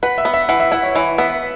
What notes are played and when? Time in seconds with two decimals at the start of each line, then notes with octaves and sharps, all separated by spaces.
0.03 B4 F#5
0.18 E5
0.25 B3
0.34 E5
0.49 E3 F#5
0.60 E5
0.72 E4 F#5
0.83 C#5
0.95 E3 F#5
1.18 B3 E5